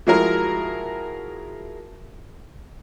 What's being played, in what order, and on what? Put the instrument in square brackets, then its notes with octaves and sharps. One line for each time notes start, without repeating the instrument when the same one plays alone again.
[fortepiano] F3 G#3 E4 F#4 G#4 A#4